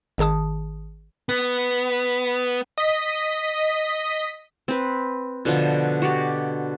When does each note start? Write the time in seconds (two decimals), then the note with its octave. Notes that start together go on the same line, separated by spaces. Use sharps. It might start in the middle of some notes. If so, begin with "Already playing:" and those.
0.18 G#1 D#3 G#4 A5 D#6
1.29 B3
2.78 D#5 B6
4.68 C4 B4
5.45 B2 D3 F3 A5
6.02 F#4 G4 D5